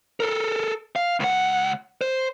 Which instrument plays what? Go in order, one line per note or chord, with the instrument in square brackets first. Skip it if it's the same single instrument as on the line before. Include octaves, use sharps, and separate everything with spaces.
[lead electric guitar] A4 A#4
F5
C#2 F#5
C5